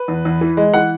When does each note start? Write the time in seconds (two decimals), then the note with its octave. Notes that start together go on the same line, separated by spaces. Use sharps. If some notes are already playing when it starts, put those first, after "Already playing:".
Already playing: B4
0.08 E2
0.25 E2
0.41 E3
0.57 G#3
0.74 E3 F#5